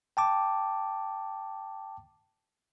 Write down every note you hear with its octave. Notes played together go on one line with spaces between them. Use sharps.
G5 A5 D6